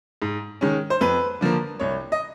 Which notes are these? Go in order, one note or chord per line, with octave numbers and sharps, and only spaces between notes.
G#2
D#3 G#3 C#4
C5
F2 B4
D3 F3 A#3
C2 C#5
D#5